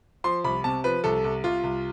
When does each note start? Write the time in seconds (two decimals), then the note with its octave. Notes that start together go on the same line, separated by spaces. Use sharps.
0.24 F3 C6
0.44 C2 B5
0.64 C3 A5
0.84 F3 B4
1.04 C2 A4
1.24 C2
1.44 C2 F4
1.64 C2